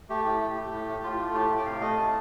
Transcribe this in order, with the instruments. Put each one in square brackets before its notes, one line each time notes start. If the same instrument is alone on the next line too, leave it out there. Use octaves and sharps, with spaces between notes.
[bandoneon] A3 G4
A2 G4
A3
A3
A2
A2
A2 F4
A3
A2 G4
A2
G5
C3 F5
A3 D#5
C3 A5